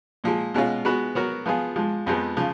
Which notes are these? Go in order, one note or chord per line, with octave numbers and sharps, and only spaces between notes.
A#2 F3 G#3
B2 G#3 C#4 F4
G#3 B3 F#4 B4
F#3 B3 F#4 A#4
F3 B3 F4 G#4
G#2 F3 G#3
F2 F3 G#3 B3
C#3 F3